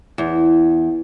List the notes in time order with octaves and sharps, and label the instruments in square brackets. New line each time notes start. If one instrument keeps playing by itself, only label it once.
[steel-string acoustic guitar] E2